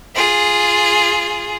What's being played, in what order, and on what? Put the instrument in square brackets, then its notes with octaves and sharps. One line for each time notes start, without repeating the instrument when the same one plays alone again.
[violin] F4 G#4